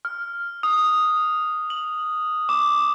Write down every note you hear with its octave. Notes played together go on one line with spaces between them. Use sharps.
F6
D#6
F#7
D6